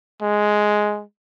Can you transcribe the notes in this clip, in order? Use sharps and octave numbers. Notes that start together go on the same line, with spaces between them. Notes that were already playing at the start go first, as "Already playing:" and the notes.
G#3